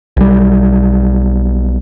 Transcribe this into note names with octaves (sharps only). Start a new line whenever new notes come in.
B1 G3